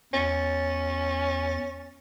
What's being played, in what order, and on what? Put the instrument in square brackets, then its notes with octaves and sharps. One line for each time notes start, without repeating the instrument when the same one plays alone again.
[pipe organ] E2 A6 [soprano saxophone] C#4